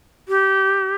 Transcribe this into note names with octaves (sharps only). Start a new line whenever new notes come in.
G4